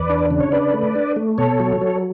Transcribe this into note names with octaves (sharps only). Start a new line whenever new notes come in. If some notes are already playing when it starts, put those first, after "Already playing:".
Already playing: E2 B4 D5
D4
C#3
C#5
D4 B4 D5
A3
D4
A3
B2 A4 C#5
F#3
F#3